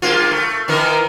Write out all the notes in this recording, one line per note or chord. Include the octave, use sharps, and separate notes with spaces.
G2 A#3 F4
A3
D#3 E3 A#4